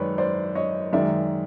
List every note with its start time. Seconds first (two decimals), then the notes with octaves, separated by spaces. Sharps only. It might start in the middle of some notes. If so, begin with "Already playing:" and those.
Already playing: F#2 D#3 G#3 B4 C#5 D5
0.18 C5 D5
0.55 C#5 D#5
0.93 F#2 D#3 G#3 D5 E5